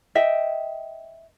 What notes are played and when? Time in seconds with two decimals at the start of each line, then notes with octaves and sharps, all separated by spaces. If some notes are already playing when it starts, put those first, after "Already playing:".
0.15 D#5 E5 G5